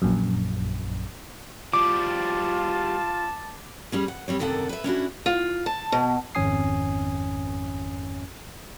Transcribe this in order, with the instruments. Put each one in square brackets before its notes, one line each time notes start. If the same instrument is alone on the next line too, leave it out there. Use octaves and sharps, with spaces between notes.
[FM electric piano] A#1 F#2
[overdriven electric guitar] F3 G3 [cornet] F4 [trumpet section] A5 [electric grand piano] D6
[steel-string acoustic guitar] G3 C#4 G#4
F#5
G3 C4 C#5
F#2 C3 D#3 A4 D5 F#5
B4 E5
C#4 D4 E4 F#4
F4
A5
B2
[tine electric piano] G#1 F2 C#4 G#5 D#6 C7